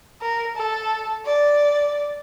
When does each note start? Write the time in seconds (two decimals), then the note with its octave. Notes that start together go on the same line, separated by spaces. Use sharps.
0.22 A#4
0.56 A4
1.26 D5